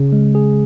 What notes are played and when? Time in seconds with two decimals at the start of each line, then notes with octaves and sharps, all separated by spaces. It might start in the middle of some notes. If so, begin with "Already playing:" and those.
Already playing: C#3
0.12 G#3
0.35 G#4